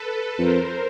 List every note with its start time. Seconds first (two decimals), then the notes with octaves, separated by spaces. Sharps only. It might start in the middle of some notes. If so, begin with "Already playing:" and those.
Already playing: A4 B4
0.38 F2 A#4 C5